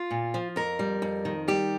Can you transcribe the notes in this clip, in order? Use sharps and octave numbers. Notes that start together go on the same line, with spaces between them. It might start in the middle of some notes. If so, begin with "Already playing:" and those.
Already playing: F4
A#2
F3
F2 A#4
G3
F2
D#3
G3 G4